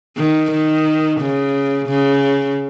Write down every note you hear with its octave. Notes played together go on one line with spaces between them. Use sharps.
D#3
D#3
C#3
C#3